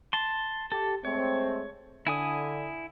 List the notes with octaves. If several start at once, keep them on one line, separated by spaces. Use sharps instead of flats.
A5 C6
G4 A4
G#3 A3 C4 C#5
D3 E4 G#5 D#6